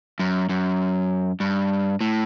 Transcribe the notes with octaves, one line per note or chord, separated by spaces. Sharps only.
F#2
F#2
G2
A2